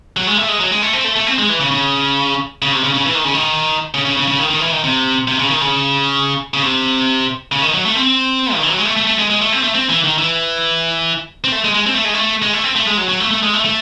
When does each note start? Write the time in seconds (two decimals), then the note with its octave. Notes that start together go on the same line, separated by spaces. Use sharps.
0.17 F#3
0.27 G#3
0.37 A3
0.48 G#3
0.60 F#3
0.71 G#3
0.82 A3
0.93 C4
1.04 A3
1.16 A3
1.26 C4
1.38 G#3
1.49 E3
1.60 C#3
1.71 C#3
2.62 C#3
2.72 C3
2.83 C#3
2.94 C#3
3.06 E3
3.15 D#3
3.25 C#3
3.34 D#3
3.94 C#3
4.05 C#3
4.17 C#3
4.28 C#3
4.39 D#3
4.50 D#3
4.61 E3
4.72 D#3
4.84 C3
5.28 C3
5.39 C#3
5.50 D#3
5.61 C#3
6.54 C#3
6.63 C3
7.52 C#3
7.62 D#3
7.74 F#3
7.85 A3
7.95 C4
8.55 D#3
8.63 E3
8.70 F#3
8.78 G#3
8.85 A3
8.97 A3
9.07 A3
9.18 G#3
9.30 G#3
9.41 A3
9.52 C4
9.63 A3
9.75 C4
9.89 E3
10.04 D#3
10.18 E3
11.44 C4
11.52 A3
11.64 G#3
11.74 G#3
11.86 C4
11.95 A3
12.05 G#3
12.14 A3
12.42 G#3
12.53 A3
12.64 C4
12.76 A3
12.87 G#3
12.97 F#3
13.09 F#3
13.20 A3
13.31 A3
13.43 G#3
13.53 A3
13.65 A3